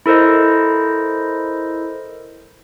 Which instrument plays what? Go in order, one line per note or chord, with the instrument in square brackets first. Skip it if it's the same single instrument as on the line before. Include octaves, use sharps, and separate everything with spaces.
[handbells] E4 A4 A#4 C5 D#5